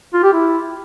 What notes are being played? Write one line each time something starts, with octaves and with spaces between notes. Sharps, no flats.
F4
G4
E4